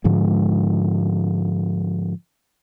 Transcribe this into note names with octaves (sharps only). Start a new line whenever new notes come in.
G#2 D3 F3 G#3